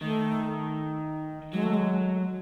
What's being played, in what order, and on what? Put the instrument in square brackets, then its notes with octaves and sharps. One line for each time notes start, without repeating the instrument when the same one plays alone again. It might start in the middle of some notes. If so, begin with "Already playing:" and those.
[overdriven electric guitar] D#3 [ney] A3
[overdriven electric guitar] F#3 [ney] G#3
[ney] A3
G#3